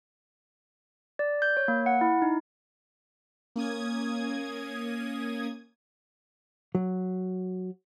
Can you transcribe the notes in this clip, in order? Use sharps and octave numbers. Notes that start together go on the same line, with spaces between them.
D5
G6
C#5
A#3
F#5
E4
D#4
A#3 C#4 D#6 G#6
F#3